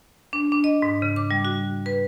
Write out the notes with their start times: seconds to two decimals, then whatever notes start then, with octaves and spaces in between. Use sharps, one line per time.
0.33 D4
0.52 D4
0.64 D#5
0.82 G#2
1.02 C#3
1.16 D6
1.31 G3
1.45 F#4
1.86 B4